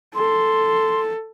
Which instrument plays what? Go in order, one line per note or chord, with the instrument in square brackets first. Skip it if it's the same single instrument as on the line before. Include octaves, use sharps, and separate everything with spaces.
[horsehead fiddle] A4 [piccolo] C6